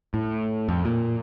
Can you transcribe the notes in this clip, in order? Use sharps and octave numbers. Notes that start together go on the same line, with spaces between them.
A2
F2
A#2